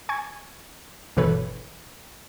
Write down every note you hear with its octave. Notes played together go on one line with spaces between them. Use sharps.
G#5 C#6 G#6
G1 B2 E3 A4 B4 C#5